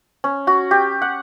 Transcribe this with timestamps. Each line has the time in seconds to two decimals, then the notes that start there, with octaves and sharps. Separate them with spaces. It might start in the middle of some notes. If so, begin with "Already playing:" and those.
0.24 C#4
0.47 F#4
0.71 G4
1.02 F#5